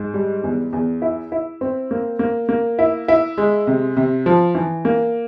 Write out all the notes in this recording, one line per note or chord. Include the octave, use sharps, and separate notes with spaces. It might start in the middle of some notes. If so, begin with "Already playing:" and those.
Already playing: G#2
G3
E2
E2
E4
E4
C4
A#3
A#3
A#3
E4
E4
G#3
C3
C3
F3
E3
A#3